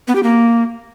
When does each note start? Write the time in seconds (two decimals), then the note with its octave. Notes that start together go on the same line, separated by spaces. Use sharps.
0.08 B3
0.15 G4
0.23 A#3